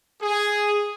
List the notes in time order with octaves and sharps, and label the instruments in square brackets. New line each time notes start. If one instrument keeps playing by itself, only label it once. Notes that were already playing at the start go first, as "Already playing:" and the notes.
[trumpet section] G#4